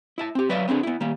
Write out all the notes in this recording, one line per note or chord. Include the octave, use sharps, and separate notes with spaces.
E4 E5 A5
C4 G4
F#3 B4 C#5 D5 E5 F5
B3 C4 D4 G4 G#4
B3 E4
D#3 G3 A#3